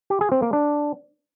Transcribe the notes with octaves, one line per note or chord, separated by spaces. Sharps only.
G4
G#4
C4
A#3
D4